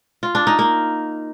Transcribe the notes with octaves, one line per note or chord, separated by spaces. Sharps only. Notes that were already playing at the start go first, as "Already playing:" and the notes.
F4
D4
D#4
A#3